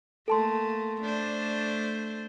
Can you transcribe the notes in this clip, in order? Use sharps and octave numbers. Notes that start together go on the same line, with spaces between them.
A3 A#3 A4 A5 C6
A3 D4 C5